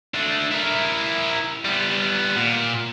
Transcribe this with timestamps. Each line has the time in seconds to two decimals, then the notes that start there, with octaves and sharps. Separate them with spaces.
0.14 A3 D4
0.52 E4 A#4
1.65 G3 B3
2.37 A#2